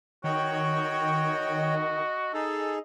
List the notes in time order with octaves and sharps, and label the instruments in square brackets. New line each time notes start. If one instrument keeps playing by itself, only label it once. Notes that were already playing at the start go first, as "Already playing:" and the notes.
[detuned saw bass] D#3 [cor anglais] F#4 [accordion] C#5 G5 [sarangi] D#5
[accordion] D#4 G#4 [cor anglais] A4